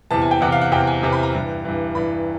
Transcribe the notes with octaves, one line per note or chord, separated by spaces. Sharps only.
E2 C3 E3 A5
G#5
G5
E2 C3 E3 F#5
F5
F#5
E2 C3 E3 G5
G#5
E2 C3 E3
B5
A#5
G2 E3
G2 E3
G2 E3 B5